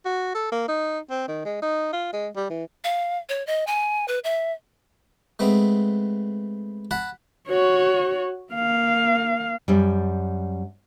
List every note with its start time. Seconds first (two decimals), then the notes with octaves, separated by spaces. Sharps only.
0.05 F#4
0.35 A4
0.52 A#3
0.69 D#4
1.10 C4
1.28 D#3
1.45 G#3
1.62 D#4
1.93 F4
2.13 G#3
2.36 G3
2.50 E3
2.84 F5
3.29 C#5
3.47 D#5
3.67 G#5
4.08 B4
4.24 E5
5.39 G#3 A3 B3 C4
6.91 F#5 A5 B5
7.48 F#4 C#5
8.53 A#3 F5
9.68 F#2 G3